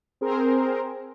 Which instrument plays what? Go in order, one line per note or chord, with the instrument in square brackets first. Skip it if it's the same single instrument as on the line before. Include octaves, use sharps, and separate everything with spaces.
[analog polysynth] C4 G#4 A#4 C5